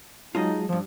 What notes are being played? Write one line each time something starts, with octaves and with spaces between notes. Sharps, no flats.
F#3 G#3 D#4 F4 G#4 D#5 A5
E2 G2 F3